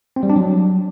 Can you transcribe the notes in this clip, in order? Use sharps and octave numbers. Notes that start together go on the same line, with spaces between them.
C4
G3
D4
F#3